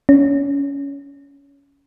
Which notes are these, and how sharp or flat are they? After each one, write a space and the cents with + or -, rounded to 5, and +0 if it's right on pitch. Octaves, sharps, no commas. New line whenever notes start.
C#4 +20